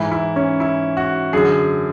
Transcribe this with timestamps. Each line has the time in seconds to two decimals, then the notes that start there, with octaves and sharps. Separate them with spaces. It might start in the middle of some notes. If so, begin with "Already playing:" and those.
Already playing: G#2 E3 E4
0.12 E4
0.36 C#4
0.60 E4
0.97 F#4
1.33 F#2 D3 G#4